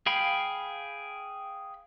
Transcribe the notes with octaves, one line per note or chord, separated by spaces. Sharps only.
G#4 F5 G5 B5